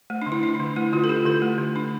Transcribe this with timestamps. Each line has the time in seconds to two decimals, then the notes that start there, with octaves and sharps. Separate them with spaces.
0.10 A3
0.22 D3 D4
0.32 E4
0.43 D4
0.54 D4
0.60 D3
0.76 A3 E4
0.93 D3 F4
1.04 A4
1.09 D4 G4
1.25 D3 A4
1.42 A3
1.58 D3
1.76 D4